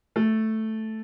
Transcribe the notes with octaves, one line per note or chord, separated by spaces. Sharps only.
A3